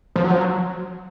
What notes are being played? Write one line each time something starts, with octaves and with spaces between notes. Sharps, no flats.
F3
F#3
F3
F#3